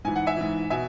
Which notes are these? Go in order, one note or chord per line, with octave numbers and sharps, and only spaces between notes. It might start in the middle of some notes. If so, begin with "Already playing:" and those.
G#2 E3 G#5
F#5
E5 G#5
G#2 E3
B2 E5 G#5